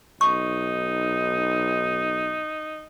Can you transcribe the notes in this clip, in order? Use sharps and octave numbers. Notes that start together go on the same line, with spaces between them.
B1 D#4 C#6